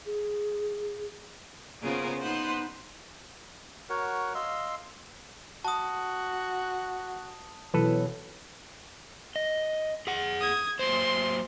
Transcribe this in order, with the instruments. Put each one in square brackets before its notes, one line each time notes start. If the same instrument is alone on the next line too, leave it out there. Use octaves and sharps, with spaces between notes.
[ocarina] G#4
[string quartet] C#3 B3 F4 G#4 A#4 C5
B3 D#4 B4 C5 F#5 C6
[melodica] F#4 A#4 C#5 F#5
D#5 F5 C6 E6
[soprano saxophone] F#4 [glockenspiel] A5 D#6
[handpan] B2 E3 F#3 [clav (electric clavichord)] A4 B4
[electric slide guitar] D#5
G#4 F#5
[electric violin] D#6 G#6
[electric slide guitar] F#3 A#3 C5 [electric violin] C6